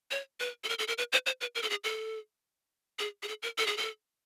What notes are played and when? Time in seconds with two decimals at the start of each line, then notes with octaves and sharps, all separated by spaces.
0.11 C#5
0.40 B4
0.64 A4
0.69 A#4
0.79 A4
0.88 A#4
0.98 B4
1.12 C5
1.26 C5
1.41 B4
1.55 A#4
1.63 A4
1.70 G#4
1.84 A4
2.99 G#4
3.23 G#4
3.28 A4
3.43 A#4
3.58 A4
3.67 G#4
3.77 A4